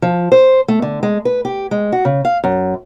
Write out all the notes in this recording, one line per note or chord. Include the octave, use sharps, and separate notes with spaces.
F3
C5
A3
D3
G#3
B4
G4
G#3
F#4
C#3
F5
F#2